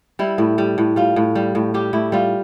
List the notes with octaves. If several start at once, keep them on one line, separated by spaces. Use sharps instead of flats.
G3 E4
A2
G3
A2
G3 F4
A2
G3
A2
G3 G4
A2 E4
G3 F4